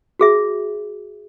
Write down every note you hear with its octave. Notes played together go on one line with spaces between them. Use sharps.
F#4 G#4 E5